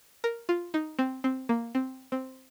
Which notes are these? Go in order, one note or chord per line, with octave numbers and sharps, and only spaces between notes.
A#4
F4
D#4
C4
C4
A#3
C4
C4